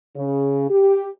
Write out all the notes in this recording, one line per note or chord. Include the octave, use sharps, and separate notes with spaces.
C#3
G4